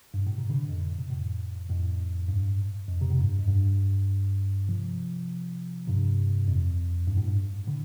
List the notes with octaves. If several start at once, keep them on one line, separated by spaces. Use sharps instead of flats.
G2
A2
C3
A2 D3
F2 A2
C3
F2 A2
F2 A2
G2
F2
C3
A2
G2
F2
G2
C3 F3
G2 C3
F2
G2
A2
G2
A2 D3